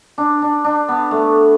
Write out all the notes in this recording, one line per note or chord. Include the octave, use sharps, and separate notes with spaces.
D4
D4
D4
B3
A3